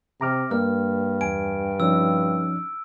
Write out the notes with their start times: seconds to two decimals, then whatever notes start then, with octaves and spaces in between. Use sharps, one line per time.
0.21 C3 A#5 D6 F6
0.51 G2 A#3 F6
1.21 E2 G#5 D7
1.80 F3 C#4 D#4 E6